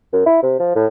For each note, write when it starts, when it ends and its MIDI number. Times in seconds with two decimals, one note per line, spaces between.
0.13 0.24 42
0.26 0.39 64
0.42 0.57 48
0.59 0.72 53
0.75 0.86 45